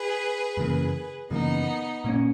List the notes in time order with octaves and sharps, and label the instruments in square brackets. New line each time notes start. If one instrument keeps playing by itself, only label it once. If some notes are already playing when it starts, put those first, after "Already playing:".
Already playing: [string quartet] G#4 B4
[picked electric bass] F#2 C#3 E3 A#3
[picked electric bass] F#2 C#3 E3 A#3 [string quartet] B3 D#4
[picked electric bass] A#2 A#3 C#4